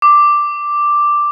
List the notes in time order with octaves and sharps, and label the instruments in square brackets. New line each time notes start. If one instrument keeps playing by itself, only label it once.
[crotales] D6